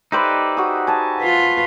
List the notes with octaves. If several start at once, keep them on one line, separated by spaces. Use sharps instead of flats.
D#4 G4 B4 C5 D5 E5
F#4 G#4
G#5 A5
F4 B4